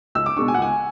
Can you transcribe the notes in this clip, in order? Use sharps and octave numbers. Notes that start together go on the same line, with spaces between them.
C#2 E6
D6
B2 G#3 D4 C#6
G#5
F#5
C#2 G#5